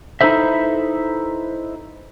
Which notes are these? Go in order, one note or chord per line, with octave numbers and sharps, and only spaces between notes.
D#4 E4 A4 B4 C5 E5